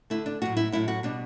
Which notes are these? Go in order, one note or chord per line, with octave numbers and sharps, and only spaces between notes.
D3 A3 E4
D4
A2 F#3 A3 F#4
E4
A2 F#3 A3 E4
F#4
B2 G3 D4